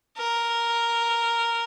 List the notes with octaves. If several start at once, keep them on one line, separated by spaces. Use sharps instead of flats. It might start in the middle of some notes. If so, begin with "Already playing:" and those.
A#4